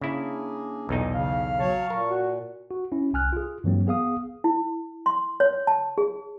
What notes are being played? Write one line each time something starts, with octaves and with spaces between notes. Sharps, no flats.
C#3 A#3 D4 E4 G#4
B1 E2 A#2 D#4
C#3 F5
F#3 C#5 A5 C#6
A#2 A#4
F#4
F#4
C#4 E4
C2 G#5 F6 F#6
F4 G#4
G2 E3 F#3 A#3 C4
B3 G#4 F5 D#6
E4
C6
C#5
A5
G#4